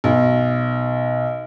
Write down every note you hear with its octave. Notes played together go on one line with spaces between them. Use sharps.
B1